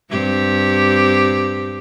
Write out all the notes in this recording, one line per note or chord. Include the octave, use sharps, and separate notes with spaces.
G2 C4 G4